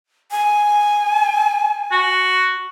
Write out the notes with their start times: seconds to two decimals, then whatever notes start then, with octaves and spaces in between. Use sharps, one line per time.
0.31 G#5
1.91 F#4